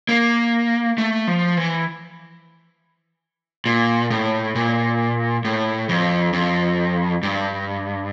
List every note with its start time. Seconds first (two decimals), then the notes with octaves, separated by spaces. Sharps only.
0.09 A#3
0.98 A3
1.27 F3
1.57 E3
3.66 A#2
4.11 A2
4.55 A#2
5.45 A2
5.89 F2
6.33 F2
7.23 G2